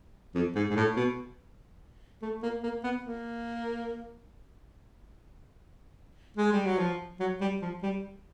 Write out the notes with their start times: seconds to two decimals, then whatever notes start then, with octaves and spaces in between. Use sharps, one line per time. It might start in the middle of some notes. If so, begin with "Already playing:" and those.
0.35 F2
0.55 G#2
0.70 G#2
0.76 A2
0.96 B2
2.22 A3
2.43 A#3
2.63 A#3
2.84 B3
3.05 A#3
6.37 G#3
6.52 G3
6.65 F#3
6.79 F3
7.20 F#3
7.41 G3
7.62 F3
7.83 G3